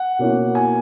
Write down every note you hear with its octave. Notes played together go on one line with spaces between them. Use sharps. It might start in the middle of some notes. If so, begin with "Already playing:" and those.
Already playing: F#5
B2 A#3 C#4 E4
G#5